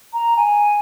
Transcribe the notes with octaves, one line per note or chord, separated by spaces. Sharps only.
A#5
G#5